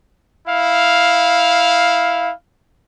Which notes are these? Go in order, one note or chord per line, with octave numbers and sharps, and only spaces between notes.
E4 F5